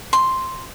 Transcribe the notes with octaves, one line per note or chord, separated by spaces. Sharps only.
C6